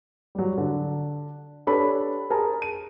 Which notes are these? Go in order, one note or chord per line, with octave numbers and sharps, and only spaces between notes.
F#3 G3
D3
D4 G4 A4 B4 C#5 B5
G#4 A#4 A5 A#5
D#7